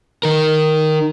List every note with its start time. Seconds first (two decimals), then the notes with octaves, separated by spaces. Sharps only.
0.23 D#3 A#4